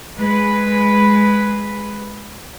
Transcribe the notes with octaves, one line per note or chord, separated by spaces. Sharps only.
G#3 B4